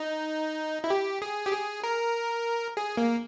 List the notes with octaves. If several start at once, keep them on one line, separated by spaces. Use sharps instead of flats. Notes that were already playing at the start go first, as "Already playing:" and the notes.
Already playing: D#4
E4
G4
G#4
G4
G#4
A#4
G#4
A#3